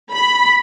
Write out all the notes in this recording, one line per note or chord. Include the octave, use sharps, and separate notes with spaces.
B5